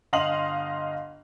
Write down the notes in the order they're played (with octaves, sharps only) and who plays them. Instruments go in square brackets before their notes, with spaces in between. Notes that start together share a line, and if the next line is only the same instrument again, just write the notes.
[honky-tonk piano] G1 D#5 F5 C6 F#7